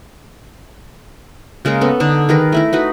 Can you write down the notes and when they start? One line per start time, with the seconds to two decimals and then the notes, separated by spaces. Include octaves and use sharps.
1.65 C#3 G#3 A#3 A#4
1.81 B3 C#4 A4
2.00 D3 D4 D#4 A5
2.29 D#3 G#4 A#4 B4
2.52 A3 E4 A#4
2.73 D#4 F#4 B4